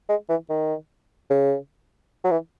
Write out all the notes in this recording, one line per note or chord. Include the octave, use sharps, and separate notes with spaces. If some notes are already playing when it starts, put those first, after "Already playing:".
G#3
E3
D#3
C#3
F#3
E3